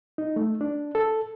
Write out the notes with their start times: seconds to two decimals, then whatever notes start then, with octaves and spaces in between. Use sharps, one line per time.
0.18 D#4
0.36 A3
0.61 D4
0.95 A4